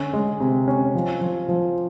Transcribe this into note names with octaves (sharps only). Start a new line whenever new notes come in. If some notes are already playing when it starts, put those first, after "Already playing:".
Already playing: D3 C#4
G#3
C3
C#4
F3
F3
F3